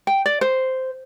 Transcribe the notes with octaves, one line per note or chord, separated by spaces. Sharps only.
G5
D5
C5